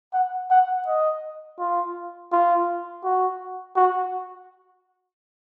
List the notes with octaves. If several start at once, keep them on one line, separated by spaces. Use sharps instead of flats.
F#5
F#5
D#5
F4
F4
F#4
F#4